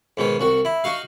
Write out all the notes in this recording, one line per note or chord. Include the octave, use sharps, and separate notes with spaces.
G#2 B2 D#3
C2 F#4
E4
D#4 F#4 F5